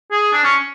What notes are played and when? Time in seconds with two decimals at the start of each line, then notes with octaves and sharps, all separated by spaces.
0.11 G#4
0.33 D4
0.44 C#4